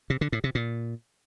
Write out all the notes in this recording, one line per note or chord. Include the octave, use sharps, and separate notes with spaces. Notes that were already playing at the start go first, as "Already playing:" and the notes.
C3
D3
A2
C3
A#2